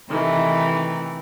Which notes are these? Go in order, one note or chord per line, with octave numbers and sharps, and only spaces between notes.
C3 D#3 E3 A3 D#4